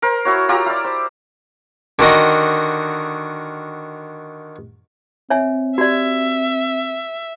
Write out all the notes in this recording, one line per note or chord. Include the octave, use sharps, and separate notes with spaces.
A#4 C5
E4 F#4 C#5
F4 G4 A#5 E6
E4 D5
C5
D3 D#3 F#4 D#5
C4 C#5 E5 G#5
F#4 G4 D5 E5